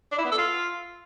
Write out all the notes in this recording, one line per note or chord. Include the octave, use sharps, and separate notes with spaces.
D4
E4
B3
A4
F4